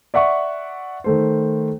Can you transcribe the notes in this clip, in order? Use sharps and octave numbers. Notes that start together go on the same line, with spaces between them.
D5 E5 F#5 C#6
D#3 A3 C5